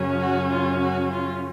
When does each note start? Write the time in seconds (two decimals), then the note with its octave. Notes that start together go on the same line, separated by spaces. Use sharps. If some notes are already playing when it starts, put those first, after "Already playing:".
Already playing: F#2 C#3 F#3 C#4
0.20 F#4
0.50 F4
0.80 F#4
1.10 F4